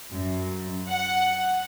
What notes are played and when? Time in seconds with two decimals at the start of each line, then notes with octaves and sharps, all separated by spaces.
0.13 F#2
0.89 F#5